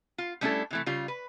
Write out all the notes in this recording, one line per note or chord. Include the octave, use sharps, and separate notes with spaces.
F4
G3 A3 C#4 D4 E4 A4
C3 E3 A3
C#3 G3 F4
B4